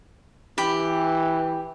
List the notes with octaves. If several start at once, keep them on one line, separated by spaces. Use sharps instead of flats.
E3 G4 B5